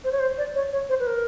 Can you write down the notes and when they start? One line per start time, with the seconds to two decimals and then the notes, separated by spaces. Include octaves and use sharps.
0.04 C5
0.12 C#5
0.20 C5
0.38 D5
0.55 C#5
0.72 C#5
0.89 C5
1.00 B4
1.07 A#4